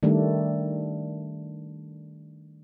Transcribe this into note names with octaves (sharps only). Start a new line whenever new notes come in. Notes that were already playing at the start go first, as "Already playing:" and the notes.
D#3 G3 A3 D4